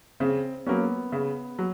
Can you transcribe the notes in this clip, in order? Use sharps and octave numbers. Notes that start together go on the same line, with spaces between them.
C#3 C4
F#3 A#3 B3 C#4
C#3
F#3